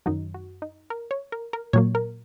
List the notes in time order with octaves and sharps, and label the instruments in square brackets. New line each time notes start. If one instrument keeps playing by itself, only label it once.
[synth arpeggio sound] F#2 D#3 F#3 D#4
F#4
D#4
A#4
C#5
A#4
A#4
A#2 F#3 A#3 C#5
A#4